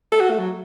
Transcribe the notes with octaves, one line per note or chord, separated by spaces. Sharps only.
A4
F#4
A3
F#3